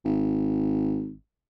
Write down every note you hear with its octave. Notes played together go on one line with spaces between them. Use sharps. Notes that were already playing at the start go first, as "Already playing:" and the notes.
G#1